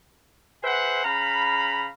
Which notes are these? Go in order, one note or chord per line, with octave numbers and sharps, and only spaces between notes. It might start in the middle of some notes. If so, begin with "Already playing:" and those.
G#4 B4 C5 E5 F#5
C#3 F5 A#5 B5